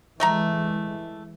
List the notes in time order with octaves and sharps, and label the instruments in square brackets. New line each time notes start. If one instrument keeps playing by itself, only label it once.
[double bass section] E3 G#3 [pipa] A3 D#5 A#5